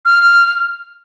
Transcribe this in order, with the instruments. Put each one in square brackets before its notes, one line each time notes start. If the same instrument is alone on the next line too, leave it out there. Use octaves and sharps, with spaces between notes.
[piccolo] F6